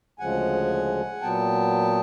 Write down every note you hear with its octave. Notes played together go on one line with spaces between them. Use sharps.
D2 C#3 F3 G#3 F#5 G#5
A#2 F#3 B3 G5 A5